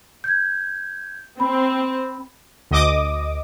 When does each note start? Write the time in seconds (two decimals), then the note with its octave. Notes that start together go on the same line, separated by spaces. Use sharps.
0.24 G6 G#6
1.40 C4 B5
2.71 D2 D#5 D6 D#6